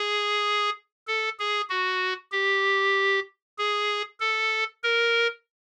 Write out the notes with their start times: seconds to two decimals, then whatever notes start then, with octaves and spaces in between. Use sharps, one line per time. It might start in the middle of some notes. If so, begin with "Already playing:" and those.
Already playing: G#4
1.07 A4
1.39 G#4
1.70 F#4
2.32 G4
3.58 G#4
4.20 A4
4.84 A#4